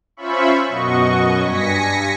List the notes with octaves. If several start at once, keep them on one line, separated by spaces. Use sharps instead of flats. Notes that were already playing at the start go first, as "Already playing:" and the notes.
C#4 F4 C5 E5 B5 C#6
F#2 B2 F#4 D#5 C#6
G2 G#5 A#6 B6 C#7